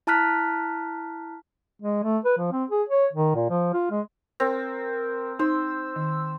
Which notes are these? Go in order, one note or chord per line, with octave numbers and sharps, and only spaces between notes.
E4 A5 A#5 F6 F#6 B6
G#3
A3
B4
F3
C4
G#4
C#5
D#3
A#2
F3
F4
G#3
C4 A#4
D#4 C5 E6
D#3